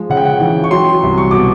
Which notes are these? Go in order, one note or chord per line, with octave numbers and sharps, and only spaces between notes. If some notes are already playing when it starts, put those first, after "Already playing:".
Already playing: F3 G#3
C#3 F#5
G5
F#5
E3 G5
C#6
F#3 C6
C2
C#6
B2 D6